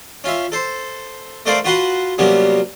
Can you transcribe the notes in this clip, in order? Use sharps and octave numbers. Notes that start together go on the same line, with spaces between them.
C#4 F4 E5
A4 C5
A3 A4 A#4 C5 D5 F5
F4 F#4 B4 F#5 A5 C6
C3 F#3 G3 A#3 B3 C#4